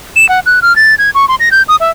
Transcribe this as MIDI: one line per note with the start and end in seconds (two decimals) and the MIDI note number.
0.16 0.28 100
0.29 0.40 78
0.46 0.59 90
0.62 0.75 89
0.76 0.95 93
0.99 1.10 92
1.14 1.25 85
1.28 1.35 84
1.40 1.49 94
1.51 1.62 91
1.68 1.76 87
1.80 1.91 76